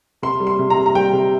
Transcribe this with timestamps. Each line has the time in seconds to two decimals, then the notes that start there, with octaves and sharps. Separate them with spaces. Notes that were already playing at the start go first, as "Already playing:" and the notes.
0.22 C3 C6
0.40 G3
0.47 C6
0.59 C3
0.70 A#5
0.77 C3
0.86 A#5
0.95 G3 G5
1.13 C3